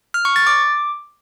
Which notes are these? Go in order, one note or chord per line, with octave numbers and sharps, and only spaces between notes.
F6
C#6
A6
D6